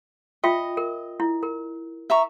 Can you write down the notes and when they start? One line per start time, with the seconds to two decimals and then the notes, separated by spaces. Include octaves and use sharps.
0.44 F4 D#5 E5 G5
0.77 A#4
1.20 E4
1.43 A#4
2.10 E5 A#5 C#6